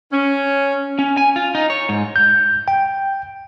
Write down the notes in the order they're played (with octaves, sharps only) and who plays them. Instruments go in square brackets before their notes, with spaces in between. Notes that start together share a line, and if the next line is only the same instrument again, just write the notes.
[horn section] C#4
[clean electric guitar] C#4
G#5
F4
D#4
C#5
G#2
[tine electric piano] G6
G5